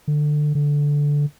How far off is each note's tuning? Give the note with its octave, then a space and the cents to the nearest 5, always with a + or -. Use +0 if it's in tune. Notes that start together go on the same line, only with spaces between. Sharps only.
D3 +20
D3 -10